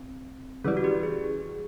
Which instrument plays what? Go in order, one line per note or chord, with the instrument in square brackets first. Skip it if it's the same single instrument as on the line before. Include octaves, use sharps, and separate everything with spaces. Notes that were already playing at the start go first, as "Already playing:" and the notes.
Already playing: [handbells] C4
[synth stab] C#3 E3 G3 [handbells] C#4
[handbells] F#4
G4
G#4